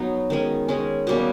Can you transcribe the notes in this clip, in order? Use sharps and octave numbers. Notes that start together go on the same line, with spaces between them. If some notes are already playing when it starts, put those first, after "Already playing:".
Already playing: F#3 B3 D#4
D#3 G#3 C#4
D#3 G#3 C#4
B2 G3 A#3 C#4